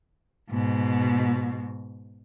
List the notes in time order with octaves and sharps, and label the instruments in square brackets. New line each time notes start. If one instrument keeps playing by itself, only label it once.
[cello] G#2 B2